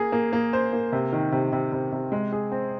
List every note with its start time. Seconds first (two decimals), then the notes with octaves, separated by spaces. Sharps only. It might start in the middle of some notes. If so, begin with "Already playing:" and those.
Already playing: A#3 G#4
0.12 A#3
0.33 A#3
0.53 C5
0.73 A#3
0.92 C3
1.12 D#3
1.32 C3
1.53 C3
1.72 C3
1.92 C3
2.12 G#3
2.32 G#4
2.52 C4